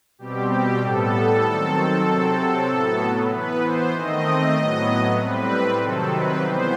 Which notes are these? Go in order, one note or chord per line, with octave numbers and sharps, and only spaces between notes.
B2 G3 C4 G4
G4
A2 G3 B3 A4
D#3 F#3 C4
C3 F#3 C4
A2 F#3 B3
E3 B3 B4
C5
D#3 A3 C4 D#5
A2 F#3 B3
A2 G3 C4 B4
C3 D#3 F#3 C4 A4
B4
E3 G3 B3 C5